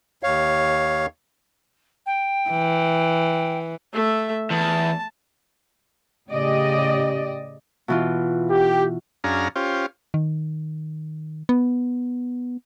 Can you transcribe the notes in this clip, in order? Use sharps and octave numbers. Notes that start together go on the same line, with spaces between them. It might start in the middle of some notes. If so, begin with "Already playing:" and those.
D#2 C#5 F5
G5
E3
A3 E5
E2 A5
A2 C#3 G4 D5 D#5
B2 E3 F4
G4
F#2 C#4 D4 G#4 F5 A#5
C#4 F4 G4 C5
D#3
B3